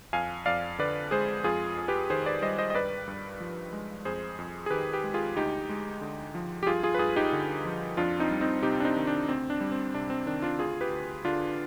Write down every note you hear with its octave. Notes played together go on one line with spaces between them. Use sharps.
F2 F5 G#5
F2 D5 F5
D3 B4 D5
G#3 G#4 C5
F2 F4 G#4
F2
G4 B4
D#3 G#4 C5
B4 D5
G3 C5 D#5
C5 D#5
D#5
G2 B4 D5
G2
F3
G#3
F2 G#4 C5
F2
G#4
D#3 G4 B4
G4 B4
G#3
F4 G#4
D2 D#4 G4
G#3
D3
F3
G4
G2 F4 G#4
F4 G#4
B4
G2 F4 G#4
D#4 G4
D3
F3
F2 D4 F4
C4 D#4
G3
C4 D#4
C3 D#4 G4
D4
C4 D#4
D#3
D4
D2 C4
D4
G3
C4
C3 D4
C4
D#3 D4
D4 F4
D2 F4 G#4
G4 B4
D2
D3 D4 F4